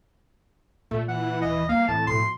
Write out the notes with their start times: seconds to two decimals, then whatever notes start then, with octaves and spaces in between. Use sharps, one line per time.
0.91 A#2 A3
1.08 E3 F#5
1.42 D#1 D#5
1.69 G3 A#3 F5
1.88 A2 E3 C4 A5
2.07 B2 F3 C6